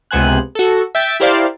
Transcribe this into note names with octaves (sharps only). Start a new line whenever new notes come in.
C#2 C3 B3 C5 G#5 F#6
F#4 A4
E5 G5 A6
E4 G4 A#4 C5 D5 F5